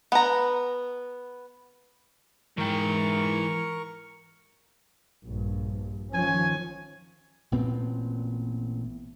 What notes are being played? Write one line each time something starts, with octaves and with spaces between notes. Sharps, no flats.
B3 A#5
G#2 E3 A#4 G5 C#6
A#1 G2
D#3 F3 C#4 G#5
A1 A#2 B3 C4